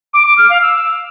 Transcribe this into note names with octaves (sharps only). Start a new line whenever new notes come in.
D6
D6
F6
F5
E6